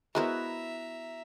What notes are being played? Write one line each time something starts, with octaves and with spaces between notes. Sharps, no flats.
G#3 B3 E4 F#4 A#4 C5 E5 A#5